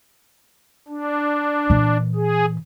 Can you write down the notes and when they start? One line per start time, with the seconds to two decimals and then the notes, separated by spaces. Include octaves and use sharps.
0.88 D4
1.70 A#2 E3
2.16 G#4